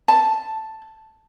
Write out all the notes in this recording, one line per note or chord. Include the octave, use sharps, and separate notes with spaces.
A5